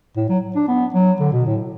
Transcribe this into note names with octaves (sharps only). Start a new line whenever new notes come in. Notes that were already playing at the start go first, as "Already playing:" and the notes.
A2
F#3
D4
B3
F#3
D3
B2
A2